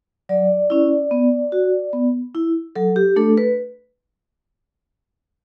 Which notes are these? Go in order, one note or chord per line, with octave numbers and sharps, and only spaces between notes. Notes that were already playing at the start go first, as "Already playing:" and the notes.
F#3 D5
C#4 E4
B3
F#4
B3
E4
F#3 A4
G4
A3 D4 A4
B4